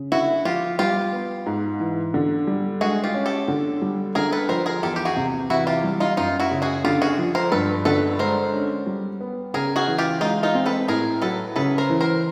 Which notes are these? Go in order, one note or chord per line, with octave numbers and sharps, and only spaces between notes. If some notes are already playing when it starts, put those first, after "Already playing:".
Already playing: C#3
D3 E4 F#4
F3 F4 G4
G3 F4 G4
B3
G#2
E3
D3
G3
G#3 F#4 G#4
F4 G4
C#4
G4 A4
D3
G3
D3 G#4 A#4
A4 B4
F3 A#4 C5
G#4 A#4
E2 G4 A4
G4
F#4 G#4
C3
E3 E4 F#4
F4 G4
G3
D#4 F4
F#2 D#4 F4
E4 F#4
C#3
F#4 G#4
D3 F4 G4
F#4 G#4
F3
A#4 C5
G2 A4 B4
D3 A4 B4
G#3 A#4 C5
C#4
G3
B3
C#3 G#4 A#4
F#4 G#4
E3
F4 G4
G#3 D#4 F4
D#4 F4
C4
A4 B4
A2 G#4 A#4
F#3 A4 B4
C#3 A4 B4
A#4 C5
E3
A#4 C5